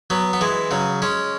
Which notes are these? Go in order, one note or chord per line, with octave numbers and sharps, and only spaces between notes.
F#3 B3
B3
E3 G#3
C#3 F#3
G#3 C#4